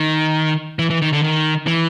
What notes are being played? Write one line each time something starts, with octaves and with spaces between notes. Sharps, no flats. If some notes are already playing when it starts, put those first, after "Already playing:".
Already playing: D#3
E3
E3
D#3
D3
D#3
E3